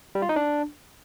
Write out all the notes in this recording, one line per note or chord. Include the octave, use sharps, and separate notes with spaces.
G3
F4
D#4
D4